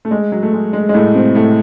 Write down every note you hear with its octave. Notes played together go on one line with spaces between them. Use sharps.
A3
G#3
F#3
A3
G#3
G#3
G#3
A2 A3
C3 C4
A2 A3